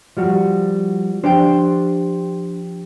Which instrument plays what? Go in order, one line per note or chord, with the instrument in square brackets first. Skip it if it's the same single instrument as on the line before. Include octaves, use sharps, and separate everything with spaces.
[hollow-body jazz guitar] F3 G3 F#4
[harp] F3 G4 G5 [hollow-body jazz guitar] D4 C5